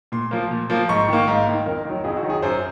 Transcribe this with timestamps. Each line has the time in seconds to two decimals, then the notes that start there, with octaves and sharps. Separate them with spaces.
0.12 A#2 C6
0.31 F3 A#3
0.51 A#2
0.70 F3 A#3
0.89 G#2 C#6
1.08 D#3 A#3
1.28 G#2 F5
1.47 D#3 A#3
1.66 F2 A#4
1.85 D#3 F#3
2.04 F2 G#4
2.17 F#4
2.23 D#3 F#3
2.30 G#4
2.42 F#2 C5